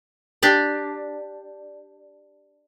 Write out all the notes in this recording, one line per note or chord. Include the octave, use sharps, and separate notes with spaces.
D4 G4 D5